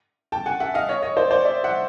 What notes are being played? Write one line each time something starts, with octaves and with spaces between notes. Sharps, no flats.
G5 A5
F#5 G#5
E5 F#5
D#5 F5
C#5 D#5
C#5 D#5
C5 D5
C5 D5
D5 E5
E5 F#5